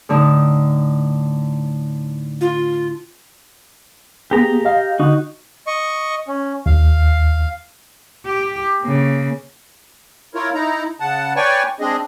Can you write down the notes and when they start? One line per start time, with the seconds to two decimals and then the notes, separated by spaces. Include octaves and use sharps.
0.09 A2 D3 D#4
2.41 F4
4.31 A#3 B3 G4 G#4 A#5
4.65 D#5 F5
5.00 D3 D#4 F#4
5.67 D#5 C#6
6.28 C#4
6.66 D#2 F5
8.26 G4
8.81 C#3 A#3
10.35 E4 F4 A#4 C#5
10.54 D#4 E4 A#5
11.00 C#3 F#5 A5
11.36 B4 C#5 D5 G5 G#5 C#6
11.80 G#3 C4 D4 G#4 D#5